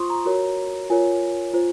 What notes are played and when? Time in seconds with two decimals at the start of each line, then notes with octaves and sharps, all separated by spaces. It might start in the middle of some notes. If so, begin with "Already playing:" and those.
Already playing: F4 C5 C6 C#6 D#6
0.10 A#5
0.25 F#4 A#4 C#5
0.90 F4 A#4 C#5 G#5
1.53 F4 C5